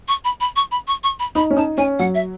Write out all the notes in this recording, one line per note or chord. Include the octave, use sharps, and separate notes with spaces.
C#6
B5
B5
C#6
B5
C#6
C#6
B5
D#4 B5
C#4
D#4 A5
C#4 G#5
F#3 F#5
E5